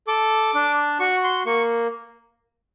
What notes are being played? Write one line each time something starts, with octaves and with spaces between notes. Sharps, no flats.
A4 D6
D4
F#4 C#6
C6
A#3 C#6